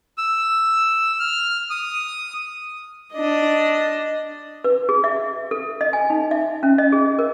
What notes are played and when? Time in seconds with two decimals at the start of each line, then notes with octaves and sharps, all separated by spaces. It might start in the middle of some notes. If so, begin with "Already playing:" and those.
0.18 E6
1.19 F6
1.70 D#6
3.14 D4 D#5
4.64 B4
4.89 G#4
5.04 E5
5.51 A4
5.81 D#5
5.93 G#5
6.10 D#4
6.31 E5
6.63 C#4
6.78 D#5
6.92 G#4
7.19 A#4